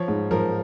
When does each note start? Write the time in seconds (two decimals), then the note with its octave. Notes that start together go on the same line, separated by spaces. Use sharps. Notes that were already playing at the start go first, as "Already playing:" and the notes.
Already playing: F3 C#5
0.08 G#2
0.31 F3 A#4